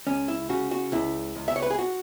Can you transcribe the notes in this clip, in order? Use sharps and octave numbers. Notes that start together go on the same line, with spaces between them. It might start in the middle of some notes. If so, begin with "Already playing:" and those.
C#2 C#4
E4
C#3 F#4
F#4
C#2 E4
C#2
E5
C#5
B4
G#4
F#4